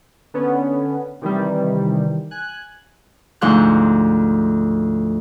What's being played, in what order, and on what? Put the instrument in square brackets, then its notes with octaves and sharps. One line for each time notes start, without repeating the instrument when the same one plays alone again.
[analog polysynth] D3 B3 C#4
C3 D#3 E3 G3
G#5 F#6
[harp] D2 G#2 F3 C6 F#6